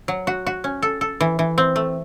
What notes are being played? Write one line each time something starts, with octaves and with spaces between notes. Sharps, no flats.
F#3
F#4
F#4
C#4
A4
A4
E3
E3
C4
A3